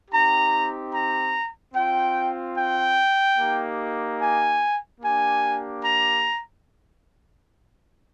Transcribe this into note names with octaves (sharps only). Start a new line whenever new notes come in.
C4 D#4 G4 A#5
A#5
C4 F4 G5
G5
A#3 D#4 G4
G#5
A#3 D4 G4 G#5
A#5